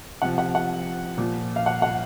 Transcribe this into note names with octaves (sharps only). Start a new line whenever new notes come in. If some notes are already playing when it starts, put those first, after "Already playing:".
C3 F3 F#5
F#5
F#5
A#2 F3
F5
F#5
F#5